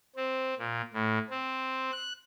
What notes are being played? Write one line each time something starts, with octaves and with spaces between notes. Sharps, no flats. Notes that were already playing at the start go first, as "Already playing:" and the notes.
C4
A#2
A2
C4
F#6